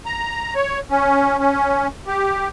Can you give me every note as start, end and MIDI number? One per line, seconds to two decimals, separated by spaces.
0.05 0.54 82
0.55 0.79 73
0.91 1.37 61
1.39 1.87 61
2.07 2.48 67